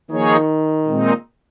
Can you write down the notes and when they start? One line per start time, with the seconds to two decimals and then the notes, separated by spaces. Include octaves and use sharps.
0.10 D#3 F3 A#3 D#4 G#4 C#5
0.86 A#2 G#3 C4 D#4